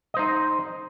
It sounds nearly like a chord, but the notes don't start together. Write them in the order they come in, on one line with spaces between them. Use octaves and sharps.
D#5 C5 D#4